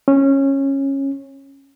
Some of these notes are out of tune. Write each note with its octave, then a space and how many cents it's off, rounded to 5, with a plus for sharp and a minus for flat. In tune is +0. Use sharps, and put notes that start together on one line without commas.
C#4 -15